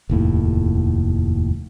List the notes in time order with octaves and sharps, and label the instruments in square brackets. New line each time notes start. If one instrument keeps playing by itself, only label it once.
[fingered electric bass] F1 D#2 A2